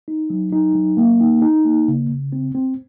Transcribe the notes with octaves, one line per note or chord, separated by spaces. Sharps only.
D#4
F#3
D#4
F#3
A#3
D#4
D#4
A#3
C#3
C#3
C4
C4